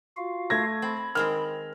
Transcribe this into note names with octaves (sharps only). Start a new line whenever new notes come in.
F4 F#4 F5
A3 G#6 A#6
C4 B5
D#3 G#3 C4 F6